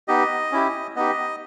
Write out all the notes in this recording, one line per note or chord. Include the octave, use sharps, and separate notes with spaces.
B3 D#4 G4 D#5
C#4 E4 G4
B3 D#4 G4 D#5